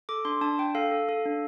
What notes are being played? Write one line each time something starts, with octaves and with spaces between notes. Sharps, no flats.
A4 D6
D4 C6
D4 A5
D4 G5
A4 F5
A4
A4
D4